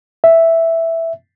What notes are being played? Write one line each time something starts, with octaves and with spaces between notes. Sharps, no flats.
E5